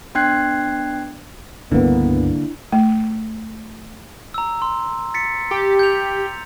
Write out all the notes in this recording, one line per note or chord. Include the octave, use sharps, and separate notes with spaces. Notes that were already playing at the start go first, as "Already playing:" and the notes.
B3 D4 G5 F#6 G#6 C7
C#2 G2 D3 A#3 B3 D4 E4
A3
A#5 E6
C6
A6 B6 C#7
G4
G6 F7